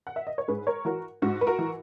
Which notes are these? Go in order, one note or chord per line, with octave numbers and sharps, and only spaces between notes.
F#5
E5
D#5
C#5
G#2 G#4 B4
A#4 C#5
E3 F#4 A#4
G#2 F#4
B4
F#4 A#4
E3